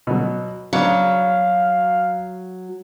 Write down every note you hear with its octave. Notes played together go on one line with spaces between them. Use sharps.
B2 F#3
C#3 F#3 B3 D4 F5